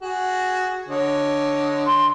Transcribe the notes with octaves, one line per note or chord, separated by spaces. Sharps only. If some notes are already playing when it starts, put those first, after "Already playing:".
F#4 G#4
D3 C#5 D#5
C6